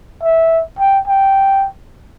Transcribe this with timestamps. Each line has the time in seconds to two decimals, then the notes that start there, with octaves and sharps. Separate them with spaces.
0.23 E5
0.79 G5
1.08 G5